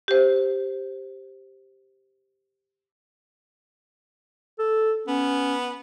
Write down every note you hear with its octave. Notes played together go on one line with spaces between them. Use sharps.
G4 C5
A4
B3 C#4